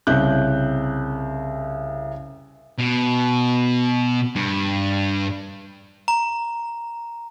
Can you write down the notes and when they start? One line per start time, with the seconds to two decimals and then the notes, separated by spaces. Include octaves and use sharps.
0.07 C2 C#3 F#6 G6
2.78 B2
4.36 G2
6.08 A#5